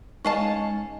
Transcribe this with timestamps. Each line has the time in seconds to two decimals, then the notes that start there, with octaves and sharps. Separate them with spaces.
0.25 G#3 C#4 D#4 D#5 F5 A5 C#6